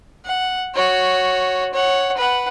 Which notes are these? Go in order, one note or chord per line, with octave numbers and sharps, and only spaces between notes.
F#5
F#4 C#5
C#5 F#5
B4 F#5